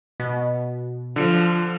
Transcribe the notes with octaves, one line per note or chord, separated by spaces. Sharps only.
B2
D3 F3